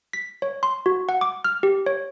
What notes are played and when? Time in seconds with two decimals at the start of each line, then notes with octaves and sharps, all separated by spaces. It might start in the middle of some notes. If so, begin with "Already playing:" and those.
0.13 B6
0.42 C#5
0.63 C6
0.86 F#4
1.09 F#5
1.21 D6
1.44 F6
1.63 G4
1.86 C#5